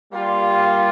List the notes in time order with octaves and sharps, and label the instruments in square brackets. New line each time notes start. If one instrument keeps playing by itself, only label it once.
[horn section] G3 A#3 F4